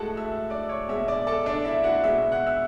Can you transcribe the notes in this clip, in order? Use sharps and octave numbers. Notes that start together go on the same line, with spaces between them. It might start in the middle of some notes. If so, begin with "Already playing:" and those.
Already playing: A2 G#3 F#4 A4 F#5 A5
E5 E6
D5 D6
C#5 C#6
B2 G#3 E5 E6
D5 D6
A4 A5
D4 D5
E4 E5
F#4 F#5
B2 G#3 E5 E6
F#5 F#6
E5 E6